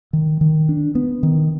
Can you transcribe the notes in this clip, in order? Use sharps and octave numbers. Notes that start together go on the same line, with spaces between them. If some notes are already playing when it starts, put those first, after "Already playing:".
D#3
D#3
D4
B3
D#3